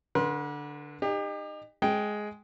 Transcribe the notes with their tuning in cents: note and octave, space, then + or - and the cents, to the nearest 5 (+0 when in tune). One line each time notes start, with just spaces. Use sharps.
D3 +0 B4 -40 C6 +0
D#4 -25 G4 +35
G#3 +10 G5 -5